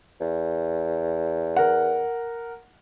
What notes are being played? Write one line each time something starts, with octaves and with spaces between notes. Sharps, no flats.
E2
A#4 F#5